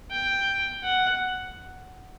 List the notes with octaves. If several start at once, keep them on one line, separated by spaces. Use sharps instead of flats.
G5
F#5